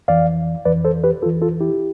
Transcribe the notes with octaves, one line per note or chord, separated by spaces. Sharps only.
F2 E3 D5 F5
F2 E3 B4 D5
A4 C5
G4 B4
F2 E3 F4 A4
F4 A4
E4 G4